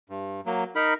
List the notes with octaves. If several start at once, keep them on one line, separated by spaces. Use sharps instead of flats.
G2
F#3 A#3
D#4 A#4 B5